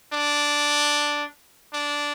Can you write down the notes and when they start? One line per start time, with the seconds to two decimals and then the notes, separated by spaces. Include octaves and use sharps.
0.13 D4
1.73 D4